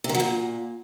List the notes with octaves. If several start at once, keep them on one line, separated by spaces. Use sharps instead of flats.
C3
D#3
F#3
A#2